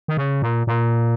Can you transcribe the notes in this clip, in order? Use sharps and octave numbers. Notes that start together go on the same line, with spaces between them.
D#3
C#3
A#2
A#2